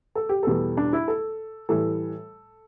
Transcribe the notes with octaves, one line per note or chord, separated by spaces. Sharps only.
A4
G4
E2 B2 G3 A4
D4
E4
A4
A2 E3 G3 A4